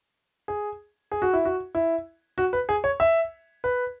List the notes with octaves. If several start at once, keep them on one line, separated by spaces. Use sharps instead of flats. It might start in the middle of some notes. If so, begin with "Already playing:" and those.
G#4
G#4
F#4
E4
F#4
E4
F#4
B4
G#4
C#5
E5
B4